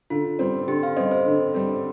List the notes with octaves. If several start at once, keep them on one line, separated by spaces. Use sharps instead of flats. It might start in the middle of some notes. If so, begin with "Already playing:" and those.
D3 F4
G3 C4
D3 G4
F5
G3 C4 D#5
C5
D3
G3 C4